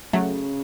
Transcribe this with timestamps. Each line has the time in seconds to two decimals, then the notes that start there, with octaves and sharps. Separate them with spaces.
0.13 C#3 F#3 A3